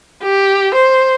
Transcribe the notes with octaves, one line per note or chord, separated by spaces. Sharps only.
G4
C5